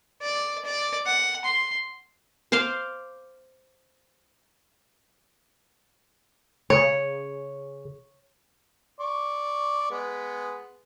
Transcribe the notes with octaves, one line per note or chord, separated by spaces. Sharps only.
D5
D5
F#5
C6
C5 F5 C6 D6
C#3 C#5
D5 C#6
G#3 B3